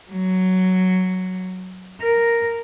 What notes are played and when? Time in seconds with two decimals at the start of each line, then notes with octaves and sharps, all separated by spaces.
0.11 F#3
2.01 A#4